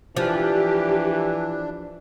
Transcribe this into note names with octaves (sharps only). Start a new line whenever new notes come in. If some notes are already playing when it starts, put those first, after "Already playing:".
E3 F3 D4 G4